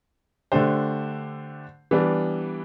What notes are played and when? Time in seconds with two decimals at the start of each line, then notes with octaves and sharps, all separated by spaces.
0.52 D3 A3 D4 G4 C5
1.91 E3 G3 B3 D4